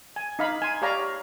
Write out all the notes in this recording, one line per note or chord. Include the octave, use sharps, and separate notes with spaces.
G#5
D#4 F5 B5
G#5 C6
G4 C#5 D5 F5 A#5 B5